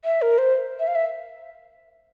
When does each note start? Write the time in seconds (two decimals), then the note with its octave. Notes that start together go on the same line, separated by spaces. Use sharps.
0.05 E5
0.22 A#4
0.38 C5
0.79 E5
0.88 F5
0.95 E5